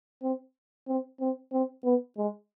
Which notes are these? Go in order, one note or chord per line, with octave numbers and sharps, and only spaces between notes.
C4
C4
C4
C4
B3
G#3